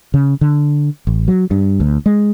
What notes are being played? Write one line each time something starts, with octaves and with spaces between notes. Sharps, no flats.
C#3
D3
A1
F#3
G2
D2
G#3